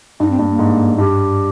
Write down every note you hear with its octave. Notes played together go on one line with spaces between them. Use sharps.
G2 D#4
C4
G2 A#3
A#3
G#2
G2 G4